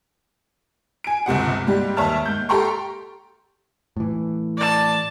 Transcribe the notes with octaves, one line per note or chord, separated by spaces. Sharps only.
G#5 D7
G1 C#2 C3 F#5
G#2 G3 G4
D#2 C#5 E5 A5 F6
G#2 G6
G4 A4 G5 A#5 C6 C#6
A2 E3
D5 A5